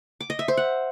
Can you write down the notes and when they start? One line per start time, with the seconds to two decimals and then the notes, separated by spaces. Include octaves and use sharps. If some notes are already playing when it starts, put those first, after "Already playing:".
0.21 D6
0.30 D#5
0.39 E5
0.48 C5
0.57 F#5